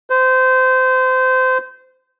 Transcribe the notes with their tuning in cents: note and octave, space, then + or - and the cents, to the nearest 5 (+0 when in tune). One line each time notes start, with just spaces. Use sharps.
C5 -25